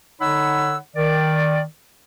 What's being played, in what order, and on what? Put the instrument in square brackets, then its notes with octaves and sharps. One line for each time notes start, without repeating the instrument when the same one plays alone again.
[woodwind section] D3 D#4 C#5 F#5 B5 E6
D#3 D5